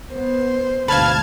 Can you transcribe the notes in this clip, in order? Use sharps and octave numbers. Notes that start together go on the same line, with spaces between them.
B3 C5
D2 G#2 B2 B4 F5 A5 F6 G#6